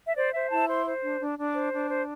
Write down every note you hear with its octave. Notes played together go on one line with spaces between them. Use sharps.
E5
C5 D5
C5 E5
E4 A5
C5 C6
C5
D4
D4
D4
C5
D4
C5